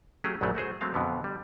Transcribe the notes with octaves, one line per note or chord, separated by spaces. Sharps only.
F#3 A3 C#4 G4 G#4
A#1 F#2 C#3 F#3 A3
A3 F#4 G#4 C5
F#3 G#3 A3 C4 F5
F2 B2 D3 B3
G3